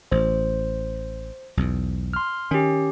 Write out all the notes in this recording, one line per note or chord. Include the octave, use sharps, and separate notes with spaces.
A1 C5
B1 E2
C6 F6
D#3 C#4 G4